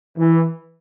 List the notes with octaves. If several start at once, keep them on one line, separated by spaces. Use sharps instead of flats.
E3